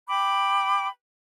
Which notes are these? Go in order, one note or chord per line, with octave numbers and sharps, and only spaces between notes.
G5 B5 D6